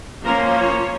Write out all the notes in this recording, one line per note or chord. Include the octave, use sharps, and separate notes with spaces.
F3 A#3 C#4 A#4
C#5